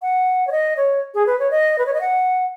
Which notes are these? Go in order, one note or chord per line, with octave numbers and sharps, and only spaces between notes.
F#5
C#5
D#5
C#5
G#4
B4
C#5
D#5
B4
C#5
D#5
F#5